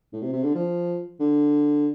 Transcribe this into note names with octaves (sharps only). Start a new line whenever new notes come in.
A2
C3
C3
D3
F3
D3